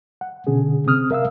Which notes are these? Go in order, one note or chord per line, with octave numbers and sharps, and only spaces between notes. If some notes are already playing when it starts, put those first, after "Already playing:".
F#5
B2 D3 C#4 G#4
C3 C4 D#6 F6
A#4 E5 F5 E6